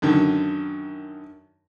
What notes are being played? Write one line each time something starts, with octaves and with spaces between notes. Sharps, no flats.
F#2 D3 D#3